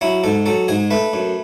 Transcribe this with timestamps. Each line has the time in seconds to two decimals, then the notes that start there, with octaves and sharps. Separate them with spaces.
0.01 F#3 E4
0.24 G#2 A4
0.46 F#3 A4
0.68 G#2 G#4
0.91 A3 B4
1.13 F#2